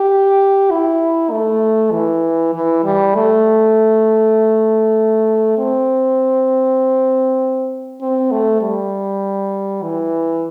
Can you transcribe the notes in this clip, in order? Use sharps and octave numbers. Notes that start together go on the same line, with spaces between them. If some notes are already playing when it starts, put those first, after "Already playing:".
Already playing: G4
E4
A3
E3
E3
G3
A3
C4
C4
A3
G3
E3